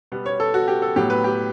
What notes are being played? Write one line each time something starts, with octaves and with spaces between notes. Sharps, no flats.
B2 G3 B3
C#5
A4
F#4
G4
A4
A2 F#3 B3 G4
B4
G4